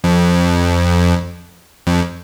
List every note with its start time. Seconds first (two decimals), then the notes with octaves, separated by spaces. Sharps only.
0.04 F2
1.87 F2